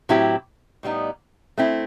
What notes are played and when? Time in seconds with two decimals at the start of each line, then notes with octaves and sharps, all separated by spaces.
0.09 A2 F#3 C4 E4 G4
0.83 A2 G3 B3 D#4
1.58 A3 C4 E4